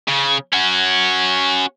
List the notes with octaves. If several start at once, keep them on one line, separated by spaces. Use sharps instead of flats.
C#3
C#4 F#4